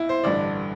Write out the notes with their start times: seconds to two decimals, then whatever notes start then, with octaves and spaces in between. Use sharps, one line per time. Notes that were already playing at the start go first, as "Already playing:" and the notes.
Already playing: B1 E4
0.09 C5
0.24 A1 G2 D3 D5